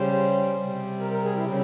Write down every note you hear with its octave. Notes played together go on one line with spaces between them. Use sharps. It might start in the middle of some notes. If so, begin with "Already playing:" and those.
Already playing: C#3 G3 C5
C3 G3
A#4
A#4
G#4
E4
C#3 G3 C4